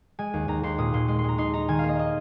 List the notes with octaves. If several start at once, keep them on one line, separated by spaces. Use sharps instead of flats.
G#3 G#5
D#2
D#2 A#5
D#2 C6
A#2 D#6
A#2 C6
G#3 C6
C6
G#3 A#5
D#4 C6
D#4 A#5
D#3 G#5
A#3 F5
D#5
D#5